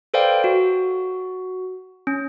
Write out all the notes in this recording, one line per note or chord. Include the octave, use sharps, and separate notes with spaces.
A4 B4 C5 D5 F5 G5
F#4
C#4